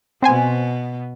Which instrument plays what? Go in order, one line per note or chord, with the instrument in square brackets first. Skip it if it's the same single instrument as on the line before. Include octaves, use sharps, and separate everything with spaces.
[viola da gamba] B2 B3 [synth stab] C4 C5 G#5